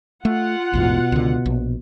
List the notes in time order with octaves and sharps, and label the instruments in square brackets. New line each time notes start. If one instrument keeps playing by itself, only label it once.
[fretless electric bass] A3 [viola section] F4 F#5
[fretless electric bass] A1 E2 G#2 [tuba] B2
[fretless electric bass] C#2 D3
A#1